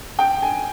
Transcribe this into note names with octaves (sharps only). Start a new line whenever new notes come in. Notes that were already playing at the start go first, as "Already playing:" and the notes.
G5
G#5